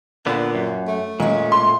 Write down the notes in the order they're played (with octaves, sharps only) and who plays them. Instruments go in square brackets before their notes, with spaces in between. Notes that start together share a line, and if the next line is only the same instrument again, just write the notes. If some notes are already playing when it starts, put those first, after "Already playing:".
[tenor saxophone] A#2 [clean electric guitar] D3 B3
[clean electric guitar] F#2
[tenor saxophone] A3
[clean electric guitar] A#2 [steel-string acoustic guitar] G#3 C#4
[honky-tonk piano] C6